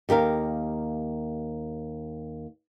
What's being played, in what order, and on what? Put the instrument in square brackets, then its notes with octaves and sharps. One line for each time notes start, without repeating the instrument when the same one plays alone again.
[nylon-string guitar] D#2 G4 A#4 F5